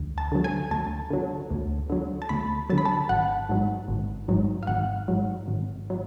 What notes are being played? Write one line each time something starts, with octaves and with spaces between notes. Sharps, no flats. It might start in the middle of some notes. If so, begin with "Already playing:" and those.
Already playing: D2
A5
D3 F#3
G#5
D2 A5
D3 F#3
D2
D3 F#3
A5
D2 B5
D3 F#3 A5
B5
A5
G#1 F#5
G#2 F#3
G#1
G#2 F#3
F5
G#1 F#5
G#2 F#3
G#1
F#3